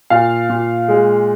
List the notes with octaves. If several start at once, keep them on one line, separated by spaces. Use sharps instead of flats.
A#2 F5
A#2
G#3